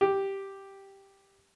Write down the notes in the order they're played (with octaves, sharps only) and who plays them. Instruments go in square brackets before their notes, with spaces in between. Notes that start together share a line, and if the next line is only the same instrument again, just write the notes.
[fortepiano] G4